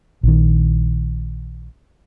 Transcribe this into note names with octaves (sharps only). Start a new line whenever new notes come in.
A#1 D#3